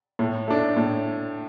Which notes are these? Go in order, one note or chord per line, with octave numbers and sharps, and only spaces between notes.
A2
A3 D4
A2